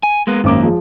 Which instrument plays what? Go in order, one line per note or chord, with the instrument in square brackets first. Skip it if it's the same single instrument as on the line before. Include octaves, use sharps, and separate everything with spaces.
[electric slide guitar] G#5
G#3 A#3 B3
[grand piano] G#1 F#2 D6 [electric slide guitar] D#3 A#3
[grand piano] F3 G#3